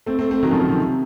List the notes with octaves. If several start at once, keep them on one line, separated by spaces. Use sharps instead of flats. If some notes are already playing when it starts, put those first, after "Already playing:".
A3 C4
A3 C4
A3 C4
D#3 F#3
C#3 F3
D#3 F#3
C3